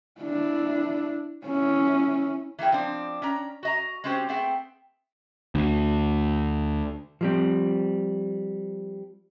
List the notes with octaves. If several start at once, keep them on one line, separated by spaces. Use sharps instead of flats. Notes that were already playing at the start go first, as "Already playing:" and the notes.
D4 E4
C#4 E4
E3 A#3 E4 G#4 G5
F3 C4 D4
C#4 D4 A#5
F#4 D#5 A#5
G#3 C4 C#4 F#4 G4 C5
A3 B3 C4 G#4 F#5 G5
D2
F3 G3 C4